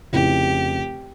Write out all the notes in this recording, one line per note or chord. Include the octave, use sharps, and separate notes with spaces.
F1 C#3 E4 G4